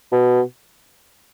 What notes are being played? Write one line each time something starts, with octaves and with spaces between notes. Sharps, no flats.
B2